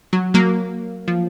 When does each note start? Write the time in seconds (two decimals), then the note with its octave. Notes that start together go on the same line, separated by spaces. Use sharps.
0.13 F#3
0.34 F#3 A#3
1.08 F3